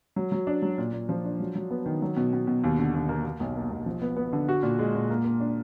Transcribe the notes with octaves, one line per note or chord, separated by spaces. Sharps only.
F#3
F#3
D4
F#3
A#2
A#2
F3
D4
F#3
F#3
B3
D#3
F#3
B2
B2
B2
D#2
D3
D#2
A#3
A#3
B1
A#3
B1
F3
B3
B3
D3
F#4
A#2
G#3
A#2
A#3
A#3
D4